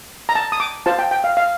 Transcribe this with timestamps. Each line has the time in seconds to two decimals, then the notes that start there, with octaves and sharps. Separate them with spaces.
0.29 A#5
0.35 A5
0.52 D#6
0.60 D6
0.86 F4 C5 A5
0.99 G5
1.11 G5
1.24 F5
1.37 F5